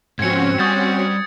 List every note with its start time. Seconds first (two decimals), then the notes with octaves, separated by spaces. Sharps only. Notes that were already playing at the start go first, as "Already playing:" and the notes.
0.19 G#2 F3 C4 C#4 F#4 G#6 C#7
0.59 G3 D#6 G6 A6